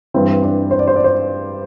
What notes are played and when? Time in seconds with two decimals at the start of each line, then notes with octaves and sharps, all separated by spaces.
0.14 G2 E3 C4
0.43 D4
0.71 C5
0.79 D5
0.88 C5
0.96 D5
1.04 C5